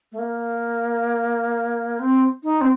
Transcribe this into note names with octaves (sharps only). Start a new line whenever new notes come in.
A3
A#3
C4
D#4
C4